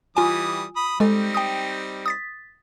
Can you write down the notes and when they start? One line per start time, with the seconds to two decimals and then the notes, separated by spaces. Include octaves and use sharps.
0.17 E3 G3 F4 G#5 D#6
0.76 B5 D#6
1.00 G3 G#3 C4 D#4 A4
1.34 G5 D#6
2.06 D#6 A6 B6